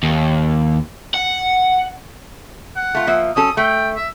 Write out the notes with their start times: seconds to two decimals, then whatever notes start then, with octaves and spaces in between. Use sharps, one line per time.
0.03 D#2
1.14 F#5
2.76 F#5
2.95 A3 F4
3.07 F3 A#3 E5
3.36 F#3 C#4 A4 D#6
3.57 A3 G5
3.96 E5